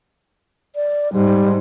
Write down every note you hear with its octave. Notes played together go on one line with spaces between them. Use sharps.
D5
G#2 G3